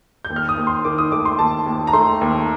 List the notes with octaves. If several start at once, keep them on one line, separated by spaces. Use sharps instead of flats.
G6
D#2
F6
D#6
D#2
C6
D#3 D6
D#6
A3 D6
C6
D#2 A5
D#2
A#5
A3 C6
D#2